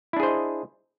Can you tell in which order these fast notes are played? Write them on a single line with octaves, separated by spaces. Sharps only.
E4 D4 G#4 C5 D#5